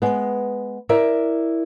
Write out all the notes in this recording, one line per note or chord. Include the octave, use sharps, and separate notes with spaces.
G#3 B3
E4 A#4 D5 E5